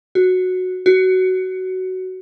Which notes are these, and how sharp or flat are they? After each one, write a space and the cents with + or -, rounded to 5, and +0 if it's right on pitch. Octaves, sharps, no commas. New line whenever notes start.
F#4 -5
F#4 +15